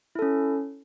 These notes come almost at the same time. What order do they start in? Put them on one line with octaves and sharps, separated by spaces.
E4 A4 C#4